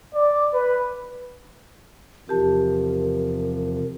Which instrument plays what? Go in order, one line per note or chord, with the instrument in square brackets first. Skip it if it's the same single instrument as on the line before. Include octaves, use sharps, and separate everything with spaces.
[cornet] D5
B4
[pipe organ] E2 C3 F3 [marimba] G4 A5 [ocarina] A#4